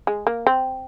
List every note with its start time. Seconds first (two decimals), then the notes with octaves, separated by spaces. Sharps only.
0.07 G#3
0.27 A#3
0.47 C4